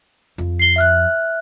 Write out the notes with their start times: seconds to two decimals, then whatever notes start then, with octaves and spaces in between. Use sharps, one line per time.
0.38 F2
0.59 C7 G7
0.76 E5 F6 F#6